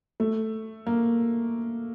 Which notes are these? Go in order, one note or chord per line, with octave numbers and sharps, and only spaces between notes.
A3
A#3